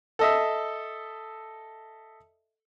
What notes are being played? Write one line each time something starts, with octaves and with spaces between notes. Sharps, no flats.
A4 D#5 E5